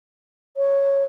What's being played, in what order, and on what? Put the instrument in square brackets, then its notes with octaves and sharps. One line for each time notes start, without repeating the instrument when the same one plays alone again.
[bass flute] C#5